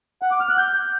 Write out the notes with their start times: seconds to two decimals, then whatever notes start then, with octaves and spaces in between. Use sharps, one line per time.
0.22 F#5
0.31 D6
0.40 F6
0.49 F#6
0.58 G6